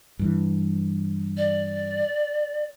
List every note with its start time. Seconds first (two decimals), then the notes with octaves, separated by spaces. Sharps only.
0.19 G2 E3
1.37 D5